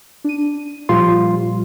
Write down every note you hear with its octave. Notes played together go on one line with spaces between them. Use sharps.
D4 D#7
A#2 F3 G3 F4 C6